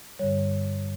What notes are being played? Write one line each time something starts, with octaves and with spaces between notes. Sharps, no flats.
G2 D3 G3 C#5